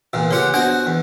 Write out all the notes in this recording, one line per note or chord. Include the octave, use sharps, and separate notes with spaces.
E2 A#2 A#3
C#3 F4 G4 B4 F#5
B3 D4 F#4 C5 D#5 F#5
E2